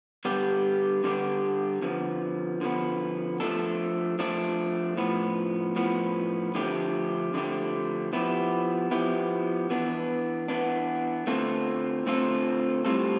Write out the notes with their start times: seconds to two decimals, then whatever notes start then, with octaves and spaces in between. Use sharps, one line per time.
0.25 D3 G3 B3 D4 G4
1.04 D3 G3 B3 D4 G4
1.82 D3 F3 B3
2.61 D3 F3 B3
3.40 F3 A3 D4 A4
4.19 F3 A3 D4 A4
4.97 A2 F3 B3
5.76 A2 F3 B3
6.55 D3 F3 A3 D4 G4
7.34 D3 F3 A3 D4 G4
8.13 F3 B3 E4 G4
8.91 F3 B3 E4 G4
9.70 E3 B3 D4
10.48 E3 B3 D4
11.27 D3 A3 C4 F4 A4
12.06 D3 A3 C4 F4 A4
12.85 A2 G3 C4 F4 A4